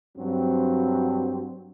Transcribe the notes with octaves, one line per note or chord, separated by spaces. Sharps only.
G2 F#3 C4